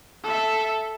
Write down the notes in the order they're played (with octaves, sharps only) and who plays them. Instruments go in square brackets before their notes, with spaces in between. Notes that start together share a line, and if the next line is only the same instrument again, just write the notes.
[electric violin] A4 E5